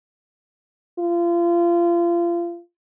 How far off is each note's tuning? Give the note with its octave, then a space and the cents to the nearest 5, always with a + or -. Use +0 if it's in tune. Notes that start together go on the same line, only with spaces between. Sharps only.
F4 -30